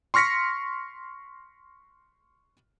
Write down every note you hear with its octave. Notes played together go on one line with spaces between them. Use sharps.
C6 C#6 F6 A#6 B6 C#7